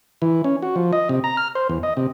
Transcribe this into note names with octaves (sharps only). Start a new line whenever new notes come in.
E3
C#4
F#4
F3
D#5
C3
A#5
F6
C5
E2
D#5
C3